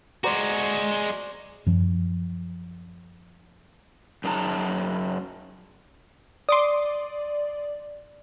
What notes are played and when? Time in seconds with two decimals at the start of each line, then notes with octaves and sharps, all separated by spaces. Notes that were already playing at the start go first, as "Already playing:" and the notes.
0.24 G#3 F#4 C5 D5 A#5
1.66 F#2 F3
4.24 F#2 D4 D#4 G#4 A5 A#5
6.49 D5 C6 D6 D#6